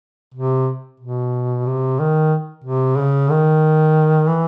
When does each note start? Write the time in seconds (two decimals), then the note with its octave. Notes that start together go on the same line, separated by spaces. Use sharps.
0.34 C3
1.00 B2
1.67 C3
1.99 D#3
2.64 C3
2.98 C#3
3.30 D#3
4.28 E3